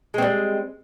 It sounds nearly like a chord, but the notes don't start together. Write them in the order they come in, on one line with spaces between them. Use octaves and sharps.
G#3 C4 G3